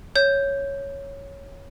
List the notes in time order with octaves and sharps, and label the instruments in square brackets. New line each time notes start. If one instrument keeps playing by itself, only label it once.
[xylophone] C#5 G6